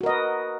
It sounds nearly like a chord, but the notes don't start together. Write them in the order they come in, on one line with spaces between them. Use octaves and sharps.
F#4 A#4 D#5 B4